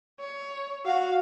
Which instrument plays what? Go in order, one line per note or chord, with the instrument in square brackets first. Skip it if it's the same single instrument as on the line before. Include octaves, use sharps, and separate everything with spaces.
[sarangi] C#5
[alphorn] F#4 [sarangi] F5